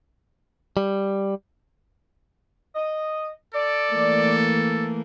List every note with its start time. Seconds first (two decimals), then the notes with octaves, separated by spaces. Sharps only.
0.77 G3
2.75 D#5
3.54 A4 D5
3.93 E3 A3 A#3